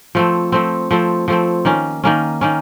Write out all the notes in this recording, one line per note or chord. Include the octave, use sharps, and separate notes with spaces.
F3 A3 C4
F3 A3 C4
F3 A3 C4
F3 A3 C4
D#3 A#3 C#4
D#3 A#3 C#4
D#3 A#3 C#4